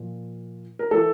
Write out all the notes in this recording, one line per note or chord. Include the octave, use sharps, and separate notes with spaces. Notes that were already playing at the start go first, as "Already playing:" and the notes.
Already playing: A#2 F3
A#4
E3 A4